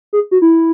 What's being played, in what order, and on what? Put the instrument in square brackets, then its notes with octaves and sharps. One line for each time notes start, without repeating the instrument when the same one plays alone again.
[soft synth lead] G#4
F#4
E4